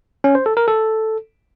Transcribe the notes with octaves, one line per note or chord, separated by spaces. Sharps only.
C#4
C5
A4
A#4
A4